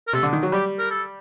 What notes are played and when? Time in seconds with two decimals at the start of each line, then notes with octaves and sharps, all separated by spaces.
0.07 A#4
0.13 C3 A4
0.23 D3
0.33 D#3
0.43 F#3
0.52 G3 G4
0.79 A#4
0.90 A4